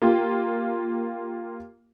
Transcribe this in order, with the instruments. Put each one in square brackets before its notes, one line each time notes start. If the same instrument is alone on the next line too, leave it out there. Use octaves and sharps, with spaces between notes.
[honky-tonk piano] A#3 F4 G4